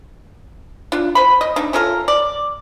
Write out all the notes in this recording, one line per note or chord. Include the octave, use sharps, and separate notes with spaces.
D4 F4
C5 B5
D#5
D4 D#4
C#4 F4 A4 A#4
D5